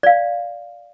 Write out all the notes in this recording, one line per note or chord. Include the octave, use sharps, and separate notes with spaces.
D5 F5